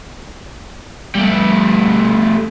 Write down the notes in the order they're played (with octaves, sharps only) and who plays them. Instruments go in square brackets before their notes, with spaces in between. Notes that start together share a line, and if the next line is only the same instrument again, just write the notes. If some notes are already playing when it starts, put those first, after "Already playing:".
[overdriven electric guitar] G3 A3